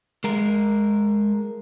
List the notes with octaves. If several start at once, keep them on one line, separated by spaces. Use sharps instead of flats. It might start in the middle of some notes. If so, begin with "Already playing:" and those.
G#3 A#4